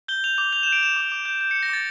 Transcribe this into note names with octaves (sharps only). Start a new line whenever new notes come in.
G6 G7
G6 F7
D6 F7
G6 F7
G6 E7
D7
G6 E7
D6
D6
G6
G6
G6 C#7
A#6
D6 A6